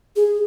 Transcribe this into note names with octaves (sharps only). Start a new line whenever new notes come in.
G#4